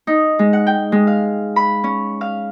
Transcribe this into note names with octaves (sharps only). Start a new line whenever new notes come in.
D#4
G#3
F#5
G5
G#3
F5
B5
C#4
F5